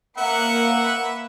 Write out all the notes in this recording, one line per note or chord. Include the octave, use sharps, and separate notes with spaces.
A#3 B4 E5 F#5 C#7